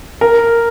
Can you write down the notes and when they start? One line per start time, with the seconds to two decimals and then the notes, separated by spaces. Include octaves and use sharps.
0.21 A#4